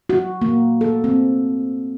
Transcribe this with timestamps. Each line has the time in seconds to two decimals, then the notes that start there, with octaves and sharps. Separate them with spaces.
0.09 F#4
0.42 A#3
0.81 A4
1.04 C4